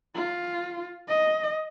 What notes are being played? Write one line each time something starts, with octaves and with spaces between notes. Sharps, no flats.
F4
D#5